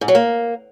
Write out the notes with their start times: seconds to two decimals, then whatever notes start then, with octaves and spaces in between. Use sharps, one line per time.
0.01 G#2
0.08 F#3
0.15 A#3